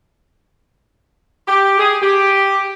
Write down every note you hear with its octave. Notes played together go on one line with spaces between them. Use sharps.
G4
G#4
G4